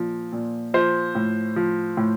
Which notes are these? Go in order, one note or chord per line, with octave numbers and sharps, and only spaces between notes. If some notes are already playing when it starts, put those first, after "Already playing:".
Already playing: A#2 F3
A#2
F3 C5
A2
F3
A2